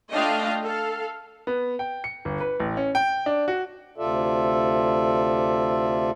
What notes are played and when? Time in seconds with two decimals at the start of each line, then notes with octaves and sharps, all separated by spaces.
0.12 A3 D4 F4 D#5 F5 G5
0.63 A4 F5
1.47 B3
1.79 G5
2.04 C#7
2.25 G1
2.40 B4
2.60 A1
2.77 C#4
2.95 G5
3.26 D4
3.48 F#4
3.98 D2 C3 F4 A4 D5 E5